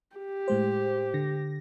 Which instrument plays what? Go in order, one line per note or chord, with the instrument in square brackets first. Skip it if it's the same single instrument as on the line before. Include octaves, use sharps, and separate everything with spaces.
[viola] G4
[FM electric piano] A2 G#3 C5
D3 A#6